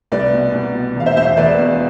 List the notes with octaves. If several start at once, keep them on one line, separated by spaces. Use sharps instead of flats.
C2 B4 D5
B2
C2
B2
E1 F5
C5 E5
E2 B2 C5 E5
C5 E5
E1 B4 D5
E2 B2